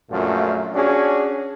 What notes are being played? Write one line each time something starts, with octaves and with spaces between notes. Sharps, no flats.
A#1 F#2 A#2 A3 F4
C#4 D4 F#4 G#4